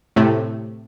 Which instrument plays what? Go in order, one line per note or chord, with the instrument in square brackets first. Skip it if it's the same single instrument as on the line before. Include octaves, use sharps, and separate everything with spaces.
[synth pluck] A2 C3 A3